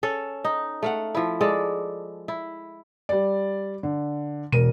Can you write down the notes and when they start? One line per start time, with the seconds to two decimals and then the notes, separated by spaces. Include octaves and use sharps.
0.03 C#4 A4
0.44 D#4
0.83 A3 F5 F#5
1.15 F3 E4
1.41 G#3 A4 D5
2.28 E4
3.09 G3 D5
3.83 D3
4.52 E1 B2 A#4 D#7